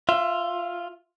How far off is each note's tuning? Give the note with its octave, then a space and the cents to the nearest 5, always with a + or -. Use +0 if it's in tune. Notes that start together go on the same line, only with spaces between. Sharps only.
F4 +0 E5 +20